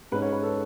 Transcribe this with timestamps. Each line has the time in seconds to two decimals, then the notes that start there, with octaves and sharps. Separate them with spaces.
0.12 G#2 G#3 C#4 B4
0.22 C#5
0.32 B4
0.43 A4